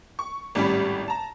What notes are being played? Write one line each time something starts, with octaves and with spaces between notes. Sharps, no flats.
C#6
G#1 A2 G3 C#4 G4 B5
A5 A#5